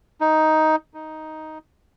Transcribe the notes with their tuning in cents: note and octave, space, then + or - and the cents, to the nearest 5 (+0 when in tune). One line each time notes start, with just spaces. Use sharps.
D#4 +10
D#4 +5